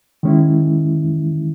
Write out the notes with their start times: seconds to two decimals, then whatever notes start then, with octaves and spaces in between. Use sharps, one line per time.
0.23 D#3 G#3 C#4 E4